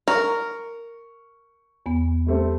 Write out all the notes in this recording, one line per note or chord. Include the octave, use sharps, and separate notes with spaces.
A#4 C#6
E2 B3
G3 A3 C4